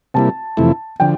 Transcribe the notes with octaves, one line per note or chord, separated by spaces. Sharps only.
C3 G3 A#3 E4 A5
F2 C3 E3 A3 E4
D3 F3 G5